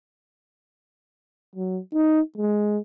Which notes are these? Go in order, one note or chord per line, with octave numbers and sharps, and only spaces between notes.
F#3
D#4
G#3